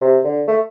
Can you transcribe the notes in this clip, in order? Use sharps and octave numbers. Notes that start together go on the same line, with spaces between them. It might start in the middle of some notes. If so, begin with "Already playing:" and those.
C3
D3
A3